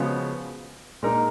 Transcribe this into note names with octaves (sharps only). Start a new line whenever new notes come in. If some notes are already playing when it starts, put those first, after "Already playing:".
Already playing: C#3 F3 G#3 B3 F#4
A#2 G#3 D#4 A#4